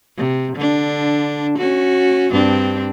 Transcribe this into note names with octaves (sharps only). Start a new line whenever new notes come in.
C3
D3 D4
C#4 F#4
G2 C4 D4